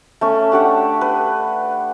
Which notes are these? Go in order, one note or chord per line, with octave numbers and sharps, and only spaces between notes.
A3 C#4
D4 G4 F#5
B4